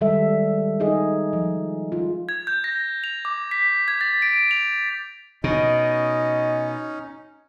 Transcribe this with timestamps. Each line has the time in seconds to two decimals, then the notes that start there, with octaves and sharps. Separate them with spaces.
0.01 D#3 G3 G#3 A4 E5
0.80 D#4 G#4 D#5
1.33 F3
1.92 F4
2.29 G#6
2.47 G6
2.64 A#6
3.04 F7
3.25 D6
3.51 B6
3.88 G#6
4.01 A6
4.22 D7
4.51 F7
5.44 B2 C#4 D#4 D#5